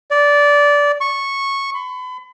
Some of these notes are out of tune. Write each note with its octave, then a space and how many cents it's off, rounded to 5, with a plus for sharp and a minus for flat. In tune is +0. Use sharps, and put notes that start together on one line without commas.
D5 -15
C#6 -10
B5 +35